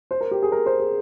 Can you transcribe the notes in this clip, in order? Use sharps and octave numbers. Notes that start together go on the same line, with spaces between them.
C5
A#4
G4
G#4
A#4
C5
G#4